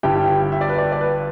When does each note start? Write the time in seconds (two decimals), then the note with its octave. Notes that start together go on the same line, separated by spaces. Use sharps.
0.03 G1 G2 G3 E4 G4 G5
0.28 G5
0.52 E5
0.61 D5
0.69 B4
0.78 D5
0.92 D5
1.01 B4